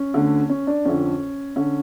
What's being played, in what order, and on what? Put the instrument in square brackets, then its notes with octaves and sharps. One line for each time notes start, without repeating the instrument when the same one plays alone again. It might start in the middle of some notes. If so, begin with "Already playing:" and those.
Already playing: [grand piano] C#4
D2 D3
C#4
D4
F2 D3 C#4
D3 C#4